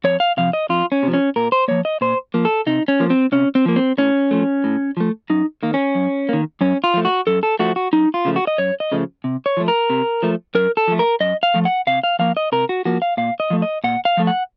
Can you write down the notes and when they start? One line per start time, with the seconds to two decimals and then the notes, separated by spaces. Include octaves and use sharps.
0.04 F2 C#5
0.20 F5
0.37 C3 F3 F5
0.53 D#5
0.69 F2 F4
0.92 C#4
1.03 C3 F3
1.13 C#4
1.36 A#2 A#4
1.52 C5
1.68 F3 A#3 C#5
1.85 D#5
2.01 A#2 C5
2.34 F3 A#3
2.45 A4
2.67 C3 D#4
2.88 C#4
3.00 F3 A#3
3.10 C4
3.32 C3 C#4
3.55 C4
3.65 F3 A#3
3.76 C4
3.98 A2 C#4
4.31 F3 A3
4.64 A2
4.97 F3 A3
5.30 F#2 D#4
5.63 D#3 A#3
5.74 C#4
5.95 F#2
6.29 D#3 A#3
6.61 F#2 C#4
6.84 F4
6.94 F3 A3
7.05 F#4
7.27 F#2 A4
7.43 A4
7.59 F3 A3 F#4
7.76 F#4
7.93 F#2 D#4
8.14 F4
8.25 C#3 F3 A3
8.36 F#4
8.47 D#5
8.58 F#2 C#5
8.80 D#5
8.92 C#3 F3 A3
9.24 C3
9.46 C#5
9.57 F3 A3
9.68 A#4
9.90 C3
10.23 F3 A3
10.55 F#2 A#4
10.77 A4
10.88 F3 A3
10.99 A#4
11.20 F#2 D#5
11.43 F5
11.54 F3 A3
11.65 F#5
11.87 C3 F5
12.04 F5
12.19 F3 A#3 F5
12.37 D#5
12.52 C3 A#4
12.69 F#4
12.85 F3 A#3 F#4
13.02 F5
13.17 A#2 F5
13.40 D#5
13.50 F3 A3
13.62 D#5
13.84 A#2 F#5
14.05 F5
14.17 F3 A3
14.27 F#5